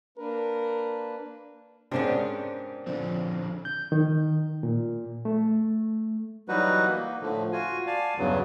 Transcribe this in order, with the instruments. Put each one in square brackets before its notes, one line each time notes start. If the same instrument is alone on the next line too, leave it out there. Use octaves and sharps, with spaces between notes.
[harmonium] A#3 D4 B4 [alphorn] A#4
[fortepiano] G#2 C3 [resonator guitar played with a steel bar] B3 C#4 D4 [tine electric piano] A#4 C5 G5
[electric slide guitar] D3 C4 [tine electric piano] F3 D5
[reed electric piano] G6
D#3
A#2
A3
[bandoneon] E3 F#3 G3 D#4 F#4 B4
A#3
A2 D3 F3 A3
F4 F#4 G#5
D5 F5 G#5 A5
E2 G2 C#3 E3 F#3